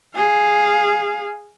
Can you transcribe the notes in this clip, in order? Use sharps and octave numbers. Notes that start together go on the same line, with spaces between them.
G#4 F5